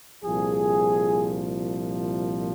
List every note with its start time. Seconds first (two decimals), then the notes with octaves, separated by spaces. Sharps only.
0.24 C2 A#2 F3 G#4